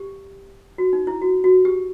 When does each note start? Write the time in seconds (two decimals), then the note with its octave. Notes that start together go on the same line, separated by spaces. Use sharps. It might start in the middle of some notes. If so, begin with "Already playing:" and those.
Already playing: G4
0.78 F#4
0.93 D#4
1.07 E4
1.22 F#4
1.44 F#4
1.65 G4